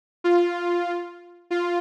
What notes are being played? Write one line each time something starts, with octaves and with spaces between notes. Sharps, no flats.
F4
F4